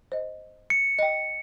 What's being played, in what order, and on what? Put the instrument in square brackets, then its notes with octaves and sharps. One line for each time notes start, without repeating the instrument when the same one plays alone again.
[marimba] C5 D#5
[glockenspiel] C#7
[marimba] D#5 G5